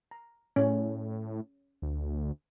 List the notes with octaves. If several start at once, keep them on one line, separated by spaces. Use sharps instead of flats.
A#5
A2 C#4
D2